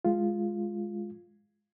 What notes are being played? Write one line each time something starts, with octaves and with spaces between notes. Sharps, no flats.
G#3 F4